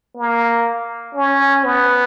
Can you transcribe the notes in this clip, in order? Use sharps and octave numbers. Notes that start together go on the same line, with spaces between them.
A#3
C#4
B3